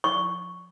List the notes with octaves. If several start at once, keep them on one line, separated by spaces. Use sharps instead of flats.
C#6